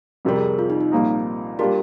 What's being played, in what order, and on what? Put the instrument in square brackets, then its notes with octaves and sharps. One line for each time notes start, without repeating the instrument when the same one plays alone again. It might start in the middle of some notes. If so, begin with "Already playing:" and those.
[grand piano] F2 C3 G3 [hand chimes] A#4
[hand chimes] G#4
F4
D#4
D#4
[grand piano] C2 A#2 F3 A#3 D#4
[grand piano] G3 A#3 D4 F4 [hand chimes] G4 A#4